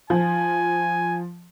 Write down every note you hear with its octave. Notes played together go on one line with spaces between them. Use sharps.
F3 G#5